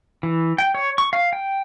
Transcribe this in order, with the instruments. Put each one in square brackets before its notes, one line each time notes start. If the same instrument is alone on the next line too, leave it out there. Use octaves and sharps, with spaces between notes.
[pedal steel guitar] E3
G5
C#5
C#6
F5
G5